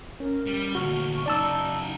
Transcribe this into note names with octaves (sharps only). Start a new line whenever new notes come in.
C#4 A#4
G3
D2 A#2 F#4 C#6 F6
C#3 F#3 D#4 D5 A5 E6